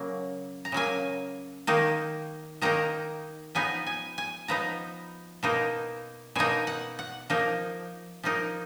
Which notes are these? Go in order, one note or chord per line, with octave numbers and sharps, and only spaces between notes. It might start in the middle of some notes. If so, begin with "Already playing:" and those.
Already playing: C#3 F#3 A#3
A#5
C#3 F#3 A#3 G#5
D#3 A#3 D#4
D#3 A#3 D#4 A#5
F3 B3 D#4 G#5
G#5
G#5
F3 B3 D#4 A#5
B2 A#3 D#4
B2 A#3 D#4 G#5
F#5
F#5
F3 A#3 D#4
F3 A#3 D#4